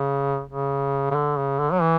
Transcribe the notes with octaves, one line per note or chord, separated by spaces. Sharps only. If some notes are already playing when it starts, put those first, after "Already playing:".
Already playing: C#3
C#3
C#3
D3
C#3
D3
F#3
E3